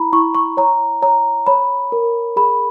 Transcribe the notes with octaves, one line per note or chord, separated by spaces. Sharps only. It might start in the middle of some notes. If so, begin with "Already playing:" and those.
Already playing: E4 A#5 B5
E4 C#6
C#6
C#5 A#5
C#5 A#5
C#5 B5
A#4
G#4 B5